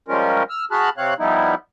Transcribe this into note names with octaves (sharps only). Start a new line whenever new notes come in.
F3 G3 G#3 C#4 F4 A#4
E6 F6
F#4 G#4 A5 B5 F6 F#6
C3 C4 C#5 F5 F#6
F3 G3 B3 D#4 E4